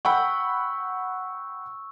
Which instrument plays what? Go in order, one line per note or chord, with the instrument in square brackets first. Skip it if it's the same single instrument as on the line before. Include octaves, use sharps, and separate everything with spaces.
[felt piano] F#5 G5 B5 [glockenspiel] C#6 E6